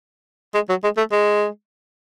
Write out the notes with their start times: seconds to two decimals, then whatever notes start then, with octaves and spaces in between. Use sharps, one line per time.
0.55 G#3
0.69 F#3
0.84 G#3
0.97 A3
1.12 G#3